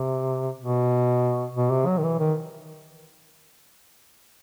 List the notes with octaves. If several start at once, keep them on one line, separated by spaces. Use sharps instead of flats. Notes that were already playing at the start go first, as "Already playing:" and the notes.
Already playing: C3
B2
B2
C3
F#3
D#3
E3
D#3